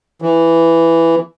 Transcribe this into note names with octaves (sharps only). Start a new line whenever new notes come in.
E3